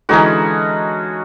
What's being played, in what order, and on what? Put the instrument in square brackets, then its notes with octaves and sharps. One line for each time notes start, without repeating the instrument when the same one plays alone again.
[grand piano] D3 E3 G#3 [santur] C#4 D#4 F#4